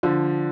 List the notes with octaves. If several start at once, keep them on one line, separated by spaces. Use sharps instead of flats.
D3 F3